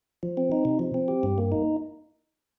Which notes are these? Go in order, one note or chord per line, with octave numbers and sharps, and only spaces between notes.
F3
C4
D#4
C3
F3
C4
G4
G2
A#3
D#4